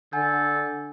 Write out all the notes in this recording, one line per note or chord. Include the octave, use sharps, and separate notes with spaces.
D3 A4 F#5 G#5 G6